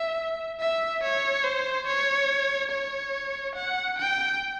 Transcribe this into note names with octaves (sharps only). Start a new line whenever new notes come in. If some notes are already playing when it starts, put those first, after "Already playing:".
Already playing: E5
E5
C#5
C5
C#5
C#5
F#5
G5